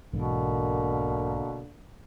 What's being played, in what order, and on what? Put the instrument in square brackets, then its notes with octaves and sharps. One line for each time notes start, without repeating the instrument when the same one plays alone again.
[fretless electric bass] B1 G#2 E3 [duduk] B2 [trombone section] D3 A#3